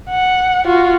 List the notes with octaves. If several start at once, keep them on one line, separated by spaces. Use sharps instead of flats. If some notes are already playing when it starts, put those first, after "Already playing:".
F#5
F4 F#4